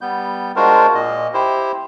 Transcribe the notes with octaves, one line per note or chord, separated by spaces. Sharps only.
G3 B3 G6
G#3 D4 F4 F#4 A#4 C5
A#2 D#5
E4 G4 C5